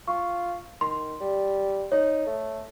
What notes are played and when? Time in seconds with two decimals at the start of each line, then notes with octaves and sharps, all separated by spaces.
0.08 F4 C#6
0.81 D#3 C6
1.21 G3
1.92 D#4 C#5
2.26 A3